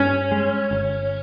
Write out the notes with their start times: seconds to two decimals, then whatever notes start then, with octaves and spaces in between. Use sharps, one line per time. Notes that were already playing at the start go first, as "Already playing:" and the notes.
Already playing: G2 C#4
0.32 G#3
0.71 G1